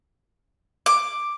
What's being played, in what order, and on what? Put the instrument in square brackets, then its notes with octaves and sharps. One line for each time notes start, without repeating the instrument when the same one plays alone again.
[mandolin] D6